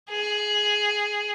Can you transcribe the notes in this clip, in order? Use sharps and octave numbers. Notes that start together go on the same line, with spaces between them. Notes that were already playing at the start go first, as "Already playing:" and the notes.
G#4